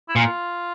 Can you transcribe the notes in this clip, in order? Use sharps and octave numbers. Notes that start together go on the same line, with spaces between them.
E4
A#2 F4